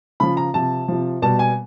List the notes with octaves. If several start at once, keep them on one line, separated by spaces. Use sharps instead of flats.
C#3 F3 B5
A#5
C3 F3 A5
C3 F3
B2 G3 A5
G#5